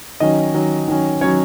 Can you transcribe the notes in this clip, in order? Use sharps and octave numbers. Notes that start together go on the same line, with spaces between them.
D#3 F#3 C#4 D#5
D#3 F#3 C#4
D#3 F#3 C#4
D#3 F#3 C#4 C#5